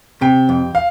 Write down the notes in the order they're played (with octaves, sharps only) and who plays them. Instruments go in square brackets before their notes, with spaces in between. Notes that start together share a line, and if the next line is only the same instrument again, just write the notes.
[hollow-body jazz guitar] C3 [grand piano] G5
[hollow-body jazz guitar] F2
[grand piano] F5